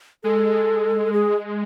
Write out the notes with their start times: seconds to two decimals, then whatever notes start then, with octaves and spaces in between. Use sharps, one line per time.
0.24 G#3 A4
1.13 G#4